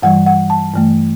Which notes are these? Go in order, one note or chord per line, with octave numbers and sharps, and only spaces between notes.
G2 E3 G3 F#5
F#5
A5
G2 E3 A3